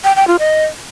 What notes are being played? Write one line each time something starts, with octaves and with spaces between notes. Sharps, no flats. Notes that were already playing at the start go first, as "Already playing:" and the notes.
G5
G5
F4
D#5